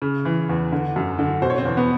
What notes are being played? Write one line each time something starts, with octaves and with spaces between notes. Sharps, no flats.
C#3
E3
E2
D3
F#2
D3
B2 C5
C#5
C4 C5
E2
B3 B4